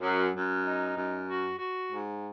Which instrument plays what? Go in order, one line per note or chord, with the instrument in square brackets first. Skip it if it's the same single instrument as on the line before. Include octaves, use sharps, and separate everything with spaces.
[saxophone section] F#2
F#2
D#4
F#2
F#4
F#4
G#2